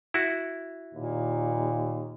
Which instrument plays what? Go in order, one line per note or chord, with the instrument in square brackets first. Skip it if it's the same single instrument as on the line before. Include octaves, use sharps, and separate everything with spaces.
[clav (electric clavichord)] E4 F#4
[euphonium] D#2 [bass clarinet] A#2